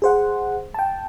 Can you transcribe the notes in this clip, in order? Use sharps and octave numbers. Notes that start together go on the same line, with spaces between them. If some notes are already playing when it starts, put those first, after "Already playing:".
G#4 C5 F#5
G5 A5